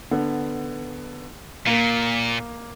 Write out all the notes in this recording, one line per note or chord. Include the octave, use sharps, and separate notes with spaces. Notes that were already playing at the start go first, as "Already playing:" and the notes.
D3 B3
A#2 A#3